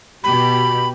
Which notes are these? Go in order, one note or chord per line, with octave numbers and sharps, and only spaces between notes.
B2 G4 B5